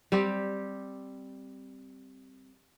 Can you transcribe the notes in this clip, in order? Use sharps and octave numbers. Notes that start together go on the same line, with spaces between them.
G3 C4 G4